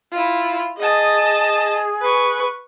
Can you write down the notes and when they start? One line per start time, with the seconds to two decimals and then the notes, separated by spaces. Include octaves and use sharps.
0.12 E4 F4
0.78 G#4 D#5 A5
2.01 B4 C#6